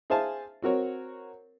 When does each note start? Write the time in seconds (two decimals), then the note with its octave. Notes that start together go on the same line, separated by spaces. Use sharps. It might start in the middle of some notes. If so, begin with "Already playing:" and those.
0.10 G#4 C5 E5 F5 G#5 A5
0.62 C4 F#4 A#4 C#5